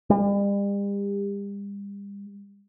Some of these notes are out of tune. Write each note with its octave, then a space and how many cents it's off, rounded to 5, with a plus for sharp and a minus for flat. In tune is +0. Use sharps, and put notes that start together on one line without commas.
G3 +40